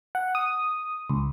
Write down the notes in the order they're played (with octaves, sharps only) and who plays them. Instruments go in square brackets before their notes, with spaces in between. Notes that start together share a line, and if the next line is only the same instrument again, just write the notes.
[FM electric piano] F#5
D#6
C#2